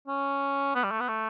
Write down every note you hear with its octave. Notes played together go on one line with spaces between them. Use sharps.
C#4
B3
G3
A3
B3
A3